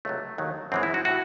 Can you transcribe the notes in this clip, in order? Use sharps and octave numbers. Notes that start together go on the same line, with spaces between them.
C#2 C3 F#3 A3
D#2 D#3 F#3
F#2 E3 G#3 C4
E4
F#4
A2 F#4